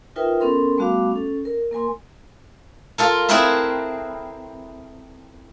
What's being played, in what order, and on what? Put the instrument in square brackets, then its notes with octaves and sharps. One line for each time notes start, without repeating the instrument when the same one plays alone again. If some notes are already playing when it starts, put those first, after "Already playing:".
[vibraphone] D#4 F4 A#4 B4 E5 G5
B3 C#4 A4 A#4 C6
G3 A3 B3 F#4 F5 D6
C#4 A4
A#4
A#3 A#4 G#5 C6
[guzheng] F4 A4 A#4
C4 E4 G#4 A#4 B4 E5